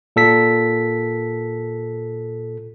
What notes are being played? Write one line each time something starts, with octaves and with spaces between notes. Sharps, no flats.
A#2 A4 B6